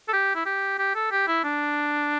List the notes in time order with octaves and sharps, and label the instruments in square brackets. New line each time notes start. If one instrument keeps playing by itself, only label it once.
[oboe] A4
G4
E4
G4
G4
A4
G4
E4
D4